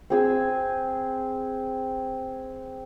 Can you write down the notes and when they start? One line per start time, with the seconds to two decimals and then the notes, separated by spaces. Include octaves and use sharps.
0.10 C4 G#4 E6